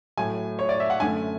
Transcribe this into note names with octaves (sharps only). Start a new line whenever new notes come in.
A2 F#3 A3 G#5
C#5
D5
E5
F#5
F#2 D3 A3 G#5